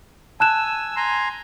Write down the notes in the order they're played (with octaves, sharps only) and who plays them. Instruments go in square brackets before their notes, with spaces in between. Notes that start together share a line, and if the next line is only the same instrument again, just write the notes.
[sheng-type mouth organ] G#5 E6 [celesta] A5 F#6 E7
[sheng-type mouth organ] G#5 A#5 C6